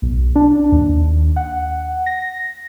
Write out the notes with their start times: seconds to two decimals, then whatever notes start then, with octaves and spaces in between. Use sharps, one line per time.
0.02 B1
0.36 D4
0.72 D#2
1.36 F#5
2.06 A#6